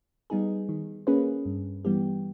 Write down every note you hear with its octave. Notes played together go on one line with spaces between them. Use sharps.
G3 B3 D#4 G#4
D#3
A#3 C#4 G#4 B4
G2
E3 G3 B3 G4